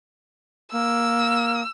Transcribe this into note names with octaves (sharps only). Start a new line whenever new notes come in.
A#3 E6